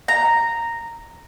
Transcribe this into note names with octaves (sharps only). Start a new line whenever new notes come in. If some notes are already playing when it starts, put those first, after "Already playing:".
A#5